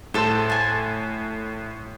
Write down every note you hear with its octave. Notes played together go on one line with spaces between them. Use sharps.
A2 A4 C5 C6
G#5 A5